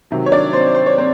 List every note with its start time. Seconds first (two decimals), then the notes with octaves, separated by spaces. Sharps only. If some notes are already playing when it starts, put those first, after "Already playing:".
0.11 C3 D#3 F#3
0.26 C#5
0.32 D4 D5
0.53 C4 C5
0.75 C5
0.86 C#5
0.98 C4 C5